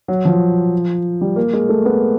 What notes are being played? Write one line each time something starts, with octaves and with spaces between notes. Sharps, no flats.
F#3
F3
G3
A#3
G#3
A3
B3